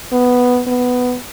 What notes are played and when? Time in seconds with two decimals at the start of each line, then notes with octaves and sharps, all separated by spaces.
0.12 B3
0.67 B3